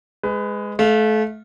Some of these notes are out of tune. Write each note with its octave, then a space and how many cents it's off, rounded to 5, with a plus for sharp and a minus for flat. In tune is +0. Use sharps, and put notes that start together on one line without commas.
G#3 +0 B4 +25
A3 -30 F5 +0